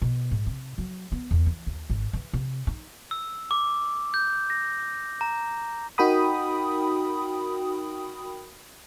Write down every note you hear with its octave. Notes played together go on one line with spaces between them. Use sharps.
B2
G#2
C3
F#3
B3
E2
E3
D#2
G#1
E3
C3
D#4
E6
D6
G6
A#6
A#5
D#4 F#4 A#4 G5 B5 D#6